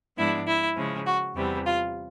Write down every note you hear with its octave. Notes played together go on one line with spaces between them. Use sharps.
G#2 F3 G#3 B3 D4 E4
E4
C#3 F3 G#3
F#4
E2 C3 E3 G3
F4